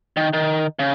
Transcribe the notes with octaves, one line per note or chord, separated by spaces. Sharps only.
D#3
D#3
C#3